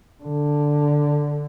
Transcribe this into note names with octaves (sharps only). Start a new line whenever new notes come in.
D3